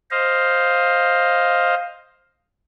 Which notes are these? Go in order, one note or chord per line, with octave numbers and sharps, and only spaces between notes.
C5 D#5 F5